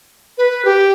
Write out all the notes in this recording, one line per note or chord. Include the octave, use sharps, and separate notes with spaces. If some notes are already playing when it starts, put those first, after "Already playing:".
B4
G4